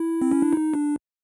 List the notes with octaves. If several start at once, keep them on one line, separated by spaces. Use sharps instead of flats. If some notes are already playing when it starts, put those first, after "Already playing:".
Already playing: E4
C4
C#4
D4
D#4
D4